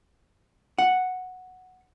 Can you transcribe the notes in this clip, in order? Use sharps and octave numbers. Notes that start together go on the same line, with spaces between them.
F#5